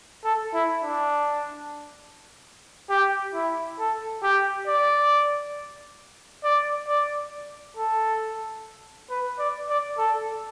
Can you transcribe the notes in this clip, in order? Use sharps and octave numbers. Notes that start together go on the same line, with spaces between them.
A4
E4
D4
G4
E4
A4
G4
D5
D5
D5
A4
B4
D5
D5
A4